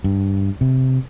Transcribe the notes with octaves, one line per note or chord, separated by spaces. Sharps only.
G2
C3